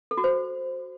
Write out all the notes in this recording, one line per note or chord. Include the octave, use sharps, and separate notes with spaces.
A4
F#4
C5